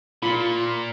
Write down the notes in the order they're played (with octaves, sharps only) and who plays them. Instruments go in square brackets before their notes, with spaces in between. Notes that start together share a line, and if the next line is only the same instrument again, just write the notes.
[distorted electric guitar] A#2 [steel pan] F4 B5